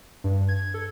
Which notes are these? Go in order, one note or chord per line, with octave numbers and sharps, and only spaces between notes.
G2
G#6
A4